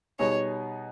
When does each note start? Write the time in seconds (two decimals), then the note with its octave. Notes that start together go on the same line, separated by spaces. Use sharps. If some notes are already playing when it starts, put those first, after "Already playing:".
0.19 B2 G3 B3 D#4 G#4 C#5